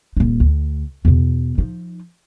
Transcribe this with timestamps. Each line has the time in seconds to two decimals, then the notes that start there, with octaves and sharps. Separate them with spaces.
0.17 D#1 D#4
0.40 D2
1.05 E2 B2
1.58 F3 D#4